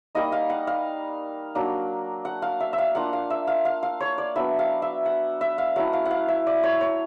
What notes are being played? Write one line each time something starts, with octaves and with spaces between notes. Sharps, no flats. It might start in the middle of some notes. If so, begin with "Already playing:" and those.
G3 A#3 D#4 D#5
F5
F#5
F5
F#3 A#3 D4
F#5
F5
E5
E5
F5
A#3 D4 F4 F#5
F5
E5
F5
F5
F5
C#5
D5
F#3 B3 D4 E5
F5
E5
F#5
E5
F5
F#3 A3 C#4 E4 F#5
F5
F#5
F5
E5
D5
C#5
C#5